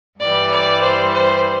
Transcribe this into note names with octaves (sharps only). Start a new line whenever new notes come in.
G2 E3 G3 D5
D5
C5
C5